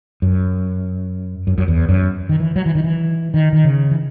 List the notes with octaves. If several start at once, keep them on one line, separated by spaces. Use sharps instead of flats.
F#2
F#2
F#2
E2
F#2
D#3
E3
F#3
E3
D#3
E3
D#3
D#3
C#3
E3